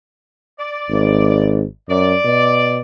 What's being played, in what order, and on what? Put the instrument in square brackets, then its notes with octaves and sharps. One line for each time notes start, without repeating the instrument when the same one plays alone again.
[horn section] D5
[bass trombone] G#1
[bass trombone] F#2 [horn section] D5
[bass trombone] B2